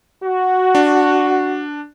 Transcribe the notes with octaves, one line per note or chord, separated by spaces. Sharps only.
F#4
D4